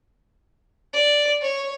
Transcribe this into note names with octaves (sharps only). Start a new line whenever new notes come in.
D5
C#5